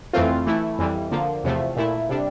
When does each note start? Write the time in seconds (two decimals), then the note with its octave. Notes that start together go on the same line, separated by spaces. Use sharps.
0.14 F2 E3 A3 C4 F4
0.46 E3 A3 E4
0.79 F2 E3 G3
1.11 D3 F3 A#3
1.44 E2 C3 F3 A3
1.77 A#2 A3 E4
2.09 C3 G3 D4